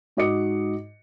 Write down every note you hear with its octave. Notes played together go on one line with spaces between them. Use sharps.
G#2 F#4 D#5 D6 C#7